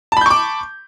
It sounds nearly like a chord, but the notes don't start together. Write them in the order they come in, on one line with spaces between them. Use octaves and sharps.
A5 B5 G6 C#6 D6